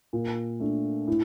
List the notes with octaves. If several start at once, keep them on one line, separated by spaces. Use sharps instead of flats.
A#2
A3 D4
A2